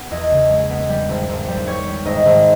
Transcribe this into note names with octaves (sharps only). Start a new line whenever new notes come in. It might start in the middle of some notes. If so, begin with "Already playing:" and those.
Already playing: B3
E2 D#5
C#3
G#3
B3
G3
G#1
G#1
G3
G3 C#5
G3
G#1 D#5
G#1